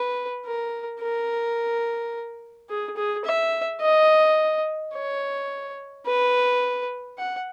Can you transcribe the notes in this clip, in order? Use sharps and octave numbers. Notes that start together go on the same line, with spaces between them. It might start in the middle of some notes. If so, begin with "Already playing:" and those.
Already playing: B4
A#4
A#4
G#4
G#4
E5
D#5
C#5
B4
F#5